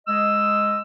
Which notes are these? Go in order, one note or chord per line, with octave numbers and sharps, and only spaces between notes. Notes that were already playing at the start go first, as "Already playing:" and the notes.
G#3 D#5 E6